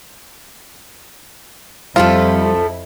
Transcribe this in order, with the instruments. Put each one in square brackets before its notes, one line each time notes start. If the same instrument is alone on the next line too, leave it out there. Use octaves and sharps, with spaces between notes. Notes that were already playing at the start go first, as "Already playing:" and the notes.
[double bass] F2 E4 [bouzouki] F3 A3 A4 [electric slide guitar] G3 [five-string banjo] F4